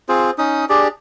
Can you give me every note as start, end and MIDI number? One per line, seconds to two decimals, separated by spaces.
0.09 0.31 60
0.09 0.31 65
0.09 0.31 68
0.09 0.31 72
0.38 0.65 61
0.38 0.65 63
0.38 0.65 87
0.69 0.88 62
0.69 0.88 67
0.69 0.88 68
0.69 0.88 74